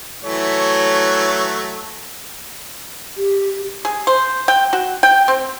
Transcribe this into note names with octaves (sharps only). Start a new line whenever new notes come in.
E3 F#3 A3 C#5
G4
G#4
C5
G5
F#4
G5
C4